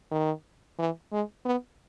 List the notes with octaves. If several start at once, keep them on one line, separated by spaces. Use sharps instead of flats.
D#3
E3
G#3
B3